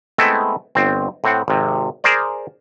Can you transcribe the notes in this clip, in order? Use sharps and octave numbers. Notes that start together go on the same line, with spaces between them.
G#3 A3 B3 C4 E4
G1 C4
A2 C4 F#5
G#1 C3
G#4 A#4 C5 D5